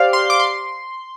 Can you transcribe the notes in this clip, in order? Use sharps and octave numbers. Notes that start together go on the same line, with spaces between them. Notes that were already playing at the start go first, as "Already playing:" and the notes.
Already playing: G4 C5 D5 F5
C6
D6
C6